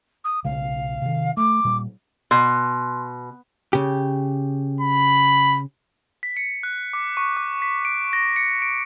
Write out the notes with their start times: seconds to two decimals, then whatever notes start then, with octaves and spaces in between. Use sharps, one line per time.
0.24 D#6
0.45 B1 C#3 G#3 F5
1.02 C3 D#3
1.37 A3 D6
1.65 A#2 G3
2.31 B2 C6
3.73 C#3 G4
4.81 B5
6.23 B6
6.37 C#7
6.63 F#6
6.93 D6
7.17 C#6
7.37 D6
7.62 B6
7.85 D7
8.13 A#6
8.36 C#7
8.62 D7